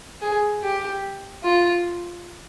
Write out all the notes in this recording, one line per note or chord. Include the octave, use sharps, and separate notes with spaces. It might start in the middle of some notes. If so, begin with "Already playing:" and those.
G#4
G4
F4